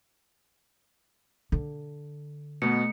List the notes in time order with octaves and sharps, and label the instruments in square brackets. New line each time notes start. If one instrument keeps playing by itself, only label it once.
[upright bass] D3
[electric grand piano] B2 B3 [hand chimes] A3 C#7